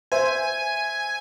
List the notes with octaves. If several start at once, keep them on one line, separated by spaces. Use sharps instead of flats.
C5 E5 G#5